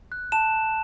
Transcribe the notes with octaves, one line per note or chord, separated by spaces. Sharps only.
F#6
A5 E7